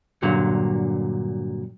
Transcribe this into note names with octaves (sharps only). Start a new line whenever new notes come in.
G2 A#2 D3 F#3